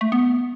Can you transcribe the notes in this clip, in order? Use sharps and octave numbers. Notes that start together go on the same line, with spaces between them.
A3
B3